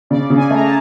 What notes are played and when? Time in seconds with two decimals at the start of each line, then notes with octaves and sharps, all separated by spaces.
0.10 C#3 D5
0.30 C#3
0.37 G#5
0.50 A3 A#5
0.64 A5